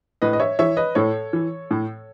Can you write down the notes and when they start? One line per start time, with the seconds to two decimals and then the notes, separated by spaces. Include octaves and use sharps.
0.22 A2 B4 D#5
0.33 D#5
0.40 C#5 E5
0.59 E3 C#5 E5
0.77 B4 D#5
0.95 A2 A4 C#5
1.33 E3
1.71 A2